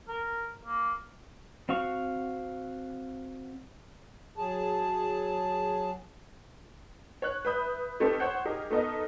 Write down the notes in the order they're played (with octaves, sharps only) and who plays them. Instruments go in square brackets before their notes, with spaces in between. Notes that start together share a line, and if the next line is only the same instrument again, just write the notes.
[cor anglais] A#4
A#3
[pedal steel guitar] C4 F#4 F5 C#6
[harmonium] F#3 G#4 A5
[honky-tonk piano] C#5 F#6
B4 E5 B5 D#6 G6
A3 C4 D#4 G4 A#4 B4
C5 C#5 F#5 G6
D#4 G4 G#4 A#4
A3 B3 D#4 A#4 D#5